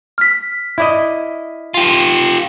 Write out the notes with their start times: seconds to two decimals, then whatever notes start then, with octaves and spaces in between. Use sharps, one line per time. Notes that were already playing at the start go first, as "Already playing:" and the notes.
0.18 F6 B6
0.78 E4 D5 D#5
1.74 F4 G4